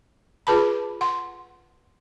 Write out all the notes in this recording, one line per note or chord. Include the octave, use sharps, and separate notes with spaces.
F4 G#4 B4 A5 B5
F#5 C6